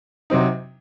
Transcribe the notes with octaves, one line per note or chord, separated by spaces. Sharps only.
C3 F#3 C4 D#4